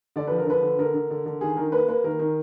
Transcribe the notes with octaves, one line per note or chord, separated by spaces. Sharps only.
D3 D5
F3 B4
A#4
D3 B4
D3
D3 A#4
D3
D3
D3
D#3 G#4
D#3 A#4
A#3 B4
A#3 B4
D#3 A#4
D#3